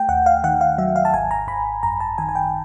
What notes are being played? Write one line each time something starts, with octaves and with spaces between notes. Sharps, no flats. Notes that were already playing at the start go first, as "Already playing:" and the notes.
Already playing: A3 G5
D#2 F#5
F5
D#3 F#5
F5
F#3 E5
F5
A5
G#1 G#5
A#5
G#1 B5
F#2 A#5
A5
D#3 G#5
G#5
G5